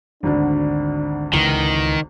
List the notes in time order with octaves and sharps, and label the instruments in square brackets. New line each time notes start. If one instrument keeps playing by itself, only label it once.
[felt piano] G#1 D2 D3 [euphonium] D4
[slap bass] C#2 E3 [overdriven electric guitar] D#3